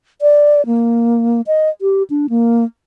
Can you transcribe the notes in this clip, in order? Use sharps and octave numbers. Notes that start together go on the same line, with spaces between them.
D5
A#3
D#5
G4
D4
A#3